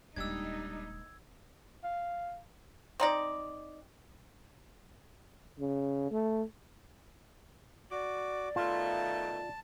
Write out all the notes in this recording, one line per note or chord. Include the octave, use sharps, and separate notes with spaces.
D#1 G3 G#3 D4 D#4 E6 G#6
F5
C4 D#4 D5
C#3
A3
F#4 D5 D6
B2 D#3 A3 F4 A5